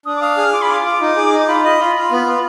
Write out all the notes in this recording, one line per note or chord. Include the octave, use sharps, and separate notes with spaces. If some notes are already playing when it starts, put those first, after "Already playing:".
D4 D#6
D6
F5 D#6
G#4 F6
F4 D6
B5
F4 D6
F4
D#4
G#4
D#4
D6
F4 B5
D#5
F4
F4
B3
F4